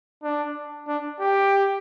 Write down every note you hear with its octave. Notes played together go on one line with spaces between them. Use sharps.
D4
D4
G4